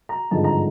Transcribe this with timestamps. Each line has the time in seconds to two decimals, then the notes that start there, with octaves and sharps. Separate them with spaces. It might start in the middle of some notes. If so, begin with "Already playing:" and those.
0.09 A#5
0.31 G#1 G2 D3 F3 G#3 A5
0.44 A#5